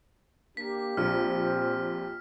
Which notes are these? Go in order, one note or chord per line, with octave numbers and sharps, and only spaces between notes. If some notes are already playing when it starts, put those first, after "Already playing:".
A#3 D4 G4 B6
A#1 C4 F6